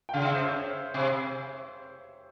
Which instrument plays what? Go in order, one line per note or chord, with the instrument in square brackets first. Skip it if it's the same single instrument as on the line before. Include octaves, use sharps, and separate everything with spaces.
[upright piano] G5
[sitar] C#3 [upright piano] F5
[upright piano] E5
C5
C#5
[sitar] C3